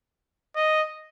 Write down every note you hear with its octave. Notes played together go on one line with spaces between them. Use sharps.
D#5